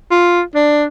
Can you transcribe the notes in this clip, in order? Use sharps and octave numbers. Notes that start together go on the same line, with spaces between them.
F4
D4